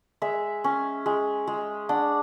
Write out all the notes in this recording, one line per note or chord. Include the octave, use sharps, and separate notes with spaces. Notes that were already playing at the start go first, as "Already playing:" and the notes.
G#3 E5
C#4
G#3
G#3
D4 F#5